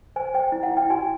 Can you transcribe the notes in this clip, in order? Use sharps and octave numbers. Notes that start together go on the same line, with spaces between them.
C5 G#5
C5 G5
E4
F#5
E4
G5
F#4 G#5